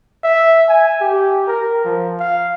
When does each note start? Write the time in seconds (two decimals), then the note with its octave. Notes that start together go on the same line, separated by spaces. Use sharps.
0.23 E5
0.68 G#5
1.01 G4
1.47 A#4
1.84 F3
2.20 F5